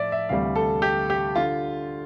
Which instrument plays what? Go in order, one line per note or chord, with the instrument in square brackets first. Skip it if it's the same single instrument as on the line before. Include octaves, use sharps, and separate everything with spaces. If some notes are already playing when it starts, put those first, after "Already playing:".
Already playing: [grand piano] A2 F3 D5 E5
E5
D2 C3 E3 G3 F5
A4
G4
G4
D3 F4